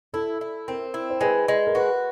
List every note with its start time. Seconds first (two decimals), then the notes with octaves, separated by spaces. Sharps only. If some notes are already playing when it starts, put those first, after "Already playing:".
0.13 E4 A4
0.41 E4
0.68 C4 A#4
0.94 E4
1.10 C5
1.21 G#3 B4
1.48 G#3
1.67 A#4
1.75 F#4 B4